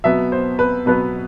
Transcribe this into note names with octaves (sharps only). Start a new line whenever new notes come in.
B2 F#3 B3 E5
C5
B4
B2 F#3 B3 B4